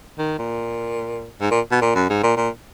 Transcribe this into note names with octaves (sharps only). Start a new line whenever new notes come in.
D#3
A#2
G#2
A#2
B2
A#2
F#2
G#2
A#2
A#2